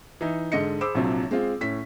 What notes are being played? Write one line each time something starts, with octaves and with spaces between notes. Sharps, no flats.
E3 D#4
G#2 D3 D#5 C#7
G#4 C5 B5 D6 E6
A#1 C3 F3 F#3
G#3 C4 F4
A2 C#4 B6